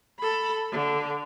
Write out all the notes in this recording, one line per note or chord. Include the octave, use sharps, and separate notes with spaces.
A4 B5
D3